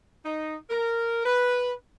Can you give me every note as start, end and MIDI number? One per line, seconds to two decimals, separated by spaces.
0.25 0.55 63
0.70 1.23 70
1.26 1.71 71